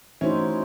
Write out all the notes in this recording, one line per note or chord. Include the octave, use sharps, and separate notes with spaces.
E3 A3 C#4 D#4 E4 F#4 C5